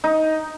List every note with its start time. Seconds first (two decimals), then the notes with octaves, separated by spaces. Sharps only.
0.04 D#4